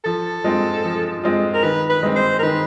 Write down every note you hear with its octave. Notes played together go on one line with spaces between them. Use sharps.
F3 A4
G#3 C4 F4
F3
G#3 C4 F4
A#4
D#3 B4
B4
G#3 C4
C5
A#4
D#3 B4